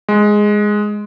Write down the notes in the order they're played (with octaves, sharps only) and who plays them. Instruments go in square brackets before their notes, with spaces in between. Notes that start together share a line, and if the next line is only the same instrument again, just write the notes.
[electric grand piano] G#3